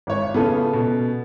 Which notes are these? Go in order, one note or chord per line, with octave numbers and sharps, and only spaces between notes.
G#1 C#5
C#3 B3 E4 F4 A4
B2